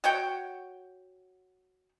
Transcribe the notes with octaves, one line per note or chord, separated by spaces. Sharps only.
F#4 C#5 F#5 G5